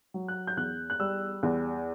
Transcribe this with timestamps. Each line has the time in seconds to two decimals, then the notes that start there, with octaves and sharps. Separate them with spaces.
0.14 F#3
0.28 F#6
0.47 G6
0.57 E2 F#6
0.90 F#6
1.00 G3 E6
1.43 E2